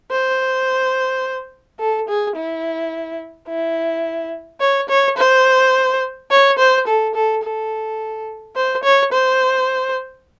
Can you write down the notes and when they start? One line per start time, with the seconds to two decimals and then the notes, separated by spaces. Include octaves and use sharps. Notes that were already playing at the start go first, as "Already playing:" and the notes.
0.11 C5
1.79 A4
2.08 G#4
2.36 E4
3.48 E4
4.61 C#5
4.89 C#5
5.17 C5
6.31 C#5
6.59 C5
6.87 A4
7.15 A4
7.43 A4
8.56 C5
8.83 C#5
9.13 C5